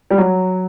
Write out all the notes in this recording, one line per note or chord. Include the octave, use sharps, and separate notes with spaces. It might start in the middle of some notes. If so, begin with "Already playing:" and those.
G3
F#3